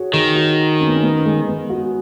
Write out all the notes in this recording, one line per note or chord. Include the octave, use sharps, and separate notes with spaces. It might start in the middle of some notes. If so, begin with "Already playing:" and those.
Already playing: F#4 G#4 C#5
D#3 G#4
F#4
C#4
B3
C#4
B3
G#3
B3
F#4